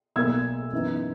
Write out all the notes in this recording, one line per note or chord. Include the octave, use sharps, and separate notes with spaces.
B1 B2 A#3 E6 G#6
F#2 E3 B3 D#4